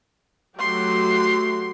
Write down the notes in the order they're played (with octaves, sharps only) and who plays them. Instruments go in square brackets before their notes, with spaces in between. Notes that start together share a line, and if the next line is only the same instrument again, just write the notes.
[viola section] F#3 A3 F#4 [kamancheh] G4 C6